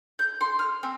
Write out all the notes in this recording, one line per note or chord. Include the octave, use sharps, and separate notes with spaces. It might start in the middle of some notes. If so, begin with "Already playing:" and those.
G6
C6
F6
C4